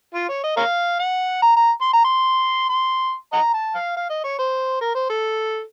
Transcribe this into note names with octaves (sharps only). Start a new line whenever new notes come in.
F4
C#5
D#5
A#4 C#5 F5
F#5
A#5
A#5
C6
A#5
C6
C6
D#5 F#5 A#5
A5
F5
F5
D#5
C#5
C5
A#4
C5
A4